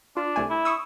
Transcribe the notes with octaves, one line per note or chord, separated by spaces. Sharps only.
D4 F4
C2 A3 G#5
E4
C#6 D#6 E6